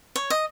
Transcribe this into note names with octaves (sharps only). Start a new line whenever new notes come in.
C#5
D#5